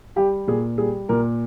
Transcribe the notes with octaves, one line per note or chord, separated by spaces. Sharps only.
G3 G4
A#2 G#4
G3 G#4
A#2 A#4